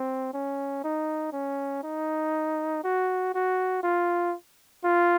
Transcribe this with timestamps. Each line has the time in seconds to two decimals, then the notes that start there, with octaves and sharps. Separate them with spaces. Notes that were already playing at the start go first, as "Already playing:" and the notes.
Already playing: C4
0.34 C#4
0.84 D#4
1.33 C#4
1.83 D#4
2.84 F#4
3.34 F#4
3.83 F4
4.84 F4